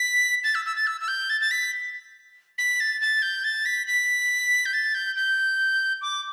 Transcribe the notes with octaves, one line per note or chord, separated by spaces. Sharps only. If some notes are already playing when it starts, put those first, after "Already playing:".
Already playing: B6
A6
E6
E6
A6
E6
E6
G6
A6
A6
B6
B6
A6
A6
G6
A6
B6
B6
G6
A6
G6
G6
D6